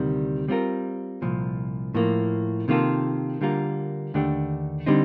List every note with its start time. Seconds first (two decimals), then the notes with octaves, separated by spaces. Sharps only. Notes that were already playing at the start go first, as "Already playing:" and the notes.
Already playing: D2 C3 D#3 G3
0.48 G3 C4 F4 A#4
1.22 C2 A#2 F3
1.95 A2 F3 A#3
2.68 C3 D#3 A#3 F4 A4
3.41 D3 G3 A#3 F4 A#4
4.14 D#2 D3 A3 D4 G4
4.86 D3 G3 C4 D#4